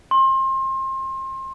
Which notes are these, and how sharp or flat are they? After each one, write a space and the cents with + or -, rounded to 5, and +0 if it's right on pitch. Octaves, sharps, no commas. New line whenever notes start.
C6 +30